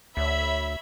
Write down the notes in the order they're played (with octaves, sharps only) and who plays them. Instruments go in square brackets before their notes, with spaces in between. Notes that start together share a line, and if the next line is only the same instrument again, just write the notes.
[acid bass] D2 [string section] C#5 E5 B5